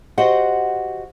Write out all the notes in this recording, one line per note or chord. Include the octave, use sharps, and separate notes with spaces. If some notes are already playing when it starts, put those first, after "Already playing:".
F#4 G4 C5 D#5 F#5